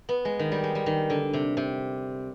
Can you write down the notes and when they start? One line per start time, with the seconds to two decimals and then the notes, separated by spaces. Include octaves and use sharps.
0.09 B3
0.25 G#3
0.39 D#3
0.52 G3
0.64 G#3
0.75 G3
0.86 D#3
1.10 D3
1.33 C3
1.57 C3